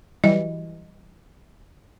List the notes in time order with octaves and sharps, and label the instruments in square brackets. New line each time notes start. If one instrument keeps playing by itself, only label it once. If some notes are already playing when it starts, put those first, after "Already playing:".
[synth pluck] E3 F#3 G3 [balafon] D#5